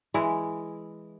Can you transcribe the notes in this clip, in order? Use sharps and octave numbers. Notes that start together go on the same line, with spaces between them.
E3 G#3 E4